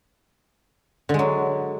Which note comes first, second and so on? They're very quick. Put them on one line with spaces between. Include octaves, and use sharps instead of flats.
D3 G#3 F#3